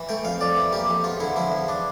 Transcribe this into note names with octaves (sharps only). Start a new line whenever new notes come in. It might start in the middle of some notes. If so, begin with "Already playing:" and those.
Already playing: E3
A3 G5
F2 F5
F2 D5
E3
A#3 G4
F2
E2 F4
D3 E4
F3 E4
E2
D4